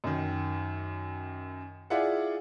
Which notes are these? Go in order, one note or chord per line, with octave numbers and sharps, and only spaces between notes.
F#2 D#3
E4 F4 G#4 D5 E5 F#5